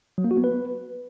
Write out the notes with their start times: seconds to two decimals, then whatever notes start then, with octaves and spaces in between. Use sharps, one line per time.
0.18 F#3
0.24 A#3
0.31 F#4
0.37 B3
0.44 B4